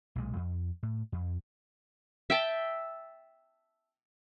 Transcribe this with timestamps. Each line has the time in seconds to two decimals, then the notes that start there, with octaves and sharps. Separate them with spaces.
0.16 B1 A#2 G#3
0.36 F2
0.83 A2
1.12 F2
2.30 E5 G5 A5